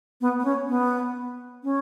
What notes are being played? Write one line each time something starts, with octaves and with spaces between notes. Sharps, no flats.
B3
B3
C#4
B3
C#4